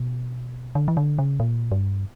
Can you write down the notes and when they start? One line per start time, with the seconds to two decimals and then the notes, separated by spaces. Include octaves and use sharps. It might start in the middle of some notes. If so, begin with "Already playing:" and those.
Already playing: B2
0.75 D3
0.88 E3
0.97 D3
1.18 C#3
1.40 A#2
1.72 G2